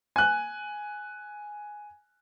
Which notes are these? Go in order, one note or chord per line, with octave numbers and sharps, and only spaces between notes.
G#5 F#6